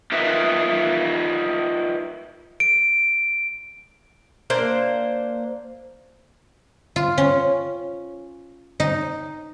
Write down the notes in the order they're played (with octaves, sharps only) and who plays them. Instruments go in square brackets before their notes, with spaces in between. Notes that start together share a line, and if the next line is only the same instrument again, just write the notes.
[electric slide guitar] D#4 F4 A#4 B4 E5
[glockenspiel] D7
[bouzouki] A#3 D4 C5 F5
[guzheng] F4
C#4
D#4